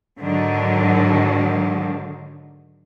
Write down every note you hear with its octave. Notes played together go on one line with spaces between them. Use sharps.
G#2 D3 D#3 F#3